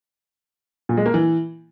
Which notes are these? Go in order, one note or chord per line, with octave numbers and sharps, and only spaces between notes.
A#2
G#3
A#3
E3